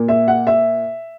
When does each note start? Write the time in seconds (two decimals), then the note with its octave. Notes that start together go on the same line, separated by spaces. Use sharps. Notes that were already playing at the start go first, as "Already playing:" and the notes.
Already playing: A#2 A#3
0.08 E5
0.28 F#5
0.47 E5